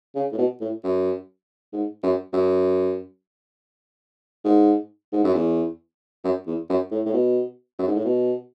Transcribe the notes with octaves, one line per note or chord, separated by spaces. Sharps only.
C#3
A2
B2
A2
F#2
G#2
F#2
F#2
G#2
G#2
F#2
E2
F#2
E2
F#2
A2
A2
B2
F#2
G#2
A2
B2